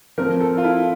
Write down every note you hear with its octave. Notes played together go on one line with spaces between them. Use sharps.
F3 A3 C4 A#4
A4
F4
E4